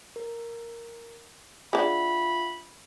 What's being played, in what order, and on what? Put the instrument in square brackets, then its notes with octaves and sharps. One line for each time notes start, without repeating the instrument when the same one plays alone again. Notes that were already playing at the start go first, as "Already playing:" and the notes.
[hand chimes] A#4
[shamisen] G#3 D4 [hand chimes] F4 E5 F#5 [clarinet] B5